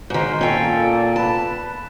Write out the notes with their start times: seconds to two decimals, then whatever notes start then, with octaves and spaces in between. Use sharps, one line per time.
0.10 G#2 D#3 C5
0.41 A#2 C#4 A4 G5
1.16 B4 A5